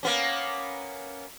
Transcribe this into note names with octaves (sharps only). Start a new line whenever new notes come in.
A#3 B3 C#4